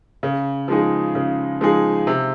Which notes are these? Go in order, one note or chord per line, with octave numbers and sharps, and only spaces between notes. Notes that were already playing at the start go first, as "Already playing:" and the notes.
C#3
F3 G#3 D#4 G#4
C#3
F3 G#3 D#4 G#4
C3